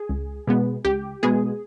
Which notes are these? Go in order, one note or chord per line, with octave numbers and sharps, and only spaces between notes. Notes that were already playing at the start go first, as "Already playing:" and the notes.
Already playing: G#4
C#2
B2 G#3 B3
C#2 G4
B2 G#3 B3 G#4